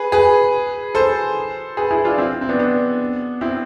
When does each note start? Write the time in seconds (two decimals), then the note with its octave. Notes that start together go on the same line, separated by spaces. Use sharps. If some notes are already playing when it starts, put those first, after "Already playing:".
Already playing: G#4 B4
0.12 G#4 B4
0.95 A4 C5
1.77 G#4 B4
1.91 E4 G#4
2.05 D4 F4
2.18 C4 E4
2.41 C4
2.49 B3 D4
2.59 B3 D4
3.41 C4 E4